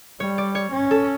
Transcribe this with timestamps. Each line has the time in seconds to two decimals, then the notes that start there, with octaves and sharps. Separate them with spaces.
0.20 G3 C#5
0.38 D5
0.55 C#5
0.73 C#4
0.91 A4